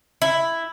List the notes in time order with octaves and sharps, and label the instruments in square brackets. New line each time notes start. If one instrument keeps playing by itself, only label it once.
[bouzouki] E4